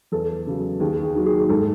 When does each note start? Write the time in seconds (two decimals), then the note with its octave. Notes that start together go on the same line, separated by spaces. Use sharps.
0.12 E2 A4
0.47 C#3 F#3
0.80 D#2 G#4
1.03 G#4
1.15 D#3 F#3
1.26 G#4
1.49 G#2 A4